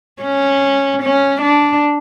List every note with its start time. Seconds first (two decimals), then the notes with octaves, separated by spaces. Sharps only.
0.23 C#4
1.03 C#4
1.42 D4